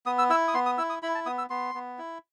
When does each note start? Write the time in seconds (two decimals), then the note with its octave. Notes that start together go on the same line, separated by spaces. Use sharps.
0.06 B3 D#6
0.19 E6
0.30 E4 E6
0.48 D#6
0.54 B3 C6
0.66 D#6
0.78 E4 E6
0.90 D#6
1.03 E4 B5
1.15 A5
1.26 B3 D#6
1.38 E6
1.50 B3 C6
1.75 B3
1.99 E4